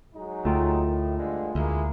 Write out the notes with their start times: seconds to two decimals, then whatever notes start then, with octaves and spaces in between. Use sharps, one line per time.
0.14 F#3 G#3 D#4
0.45 D2 A3 F4 G5
0.85 A2 D#3
1.17 G2 D3 G#3
1.55 D2 G#3 A#3 E4